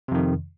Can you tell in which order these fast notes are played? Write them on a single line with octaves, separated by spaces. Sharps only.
C3 F2 D#3